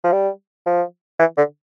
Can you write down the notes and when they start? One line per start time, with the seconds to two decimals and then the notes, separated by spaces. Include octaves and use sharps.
0.04 F3
0.13 G3
0.66 F3
1.19 E3
1.37 D3